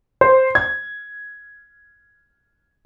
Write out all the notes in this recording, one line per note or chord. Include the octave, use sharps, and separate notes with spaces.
C5
G#6